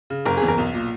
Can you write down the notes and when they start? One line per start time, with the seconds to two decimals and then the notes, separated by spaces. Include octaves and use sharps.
0.10 C#3
0.26 F#1 A#4
0.37 E2 G#4
0.48 A#4
0.58 B1
0.74 A#2